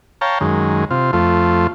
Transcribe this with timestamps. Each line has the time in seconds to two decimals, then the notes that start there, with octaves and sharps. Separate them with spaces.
0.21 C#5 F5 G5 A5 A#5
0.41 F#2 D#3 G#3
0.91 C3 F4
1.13 F2 A3 F4